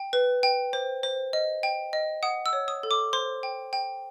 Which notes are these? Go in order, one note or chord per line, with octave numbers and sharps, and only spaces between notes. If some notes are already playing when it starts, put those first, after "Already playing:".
Already playing: G5
B4
G5
C5
C5
D#5
G5
D#5
F#5 D#6
E6
C#5
D#6
A4
D6
C5 C6
G5
G5